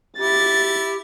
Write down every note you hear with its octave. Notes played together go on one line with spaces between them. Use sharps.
E4 G4 A6